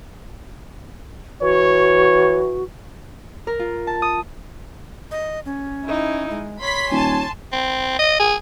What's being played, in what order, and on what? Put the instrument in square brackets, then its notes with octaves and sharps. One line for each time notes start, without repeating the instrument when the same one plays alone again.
[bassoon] E3 [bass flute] F#4 [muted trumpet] C#5
[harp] A#4
F4
A5
D#6
[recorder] D#5
C#4
[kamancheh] D#4 E4
[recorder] G#3
[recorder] C#5 [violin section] B5 B6 [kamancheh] C6
[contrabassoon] D#1 [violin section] G#5 A5
[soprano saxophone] C4
D#5
G#4